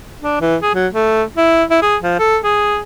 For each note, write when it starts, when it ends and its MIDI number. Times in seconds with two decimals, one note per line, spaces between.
0.22 0.40 62
0.41 0.57 52
0.62 0.74 68
0.75 0.87 54
0.93 1.23 57
1.37 1.64 64
1.71 1.78 64
1.82 1.97 68
2.03 2.16 53
2.19 2.38 69
2.43 2.80 68